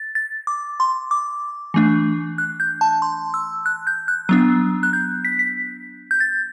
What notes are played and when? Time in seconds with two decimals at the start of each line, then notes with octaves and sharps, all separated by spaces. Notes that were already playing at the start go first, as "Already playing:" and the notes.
Already playing: A6
0.15 A6
0.47 D6
0.80 C6
1.11 D6
1.74 E3 A3 D4
2.38 F#6
2.60 G6
2.81 A5
3.02 C6
3.34 E6
3.66 F#6
3.87 G6
4.08 F#6
4.29 F#3 B3 D4
4.83 F#6
4.93 G6
5.25 B6
5.39 B6
6.11 G6
6.20 A6